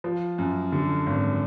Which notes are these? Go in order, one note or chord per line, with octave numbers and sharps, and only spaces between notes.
F3
F#2
D3
G#1